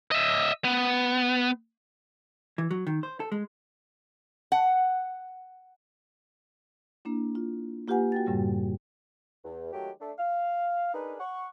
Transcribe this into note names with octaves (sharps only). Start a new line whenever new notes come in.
D#5 E5
B3
E3
F#3
D#3
C5
A4
G#3
F#5
A#3 D4 E4
F4
A#3 F4 G4 B4 F#5 G#5
F#4 G5 A6
F#2 A2 C#3 G3
E2
D#3 F#3 G#3 A3 G4
A3 D4
F5
D4 D#4 G#4 A#4 B4
F#5 C#6